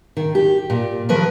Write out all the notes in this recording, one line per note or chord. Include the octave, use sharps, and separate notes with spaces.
D#3
G4
A#2
D#3 F3 A#4 B4